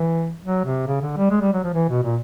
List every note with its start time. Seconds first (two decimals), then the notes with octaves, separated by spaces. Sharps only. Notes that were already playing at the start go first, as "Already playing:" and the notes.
Already playing: E3
0.44 F#3
0.65 C3
0.87 C#3
1.02 D3
1.17 G3
1.30 G#3
1.41 G3
1.53 F#3
1.64 F3
1.74 E3
1.89 B2
2.03 A#2